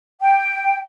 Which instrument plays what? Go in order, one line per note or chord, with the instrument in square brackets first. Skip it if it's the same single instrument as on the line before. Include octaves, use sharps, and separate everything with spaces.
[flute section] G5